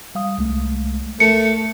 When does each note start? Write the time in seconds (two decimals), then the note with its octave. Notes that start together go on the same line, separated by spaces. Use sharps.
0.15 G3 F5 D#6
0.38 C2 G#3 A3
1.20 A3 A#4 C#7